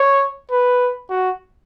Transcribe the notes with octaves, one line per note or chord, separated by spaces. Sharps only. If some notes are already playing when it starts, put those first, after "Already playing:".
Already playing: C#5
B4
F#4